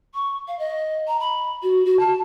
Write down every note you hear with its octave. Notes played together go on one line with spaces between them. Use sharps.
C#6
F5
D#5
A#5
B5
F#4
F#4
A5